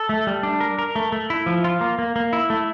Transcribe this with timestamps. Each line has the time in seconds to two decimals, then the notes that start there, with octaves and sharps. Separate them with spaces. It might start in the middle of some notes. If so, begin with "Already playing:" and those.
Already playing: A4
0.09 A3
0.27 G3
0.43 D4
0.61 A#4
0.79 A#4
0.96 A3
1.12 A3
1.30 E4
1.46 F3
1.64 F4
1.81 A#3
1.99 A#3
2.16 A#3
2.33 E4
2.50 A3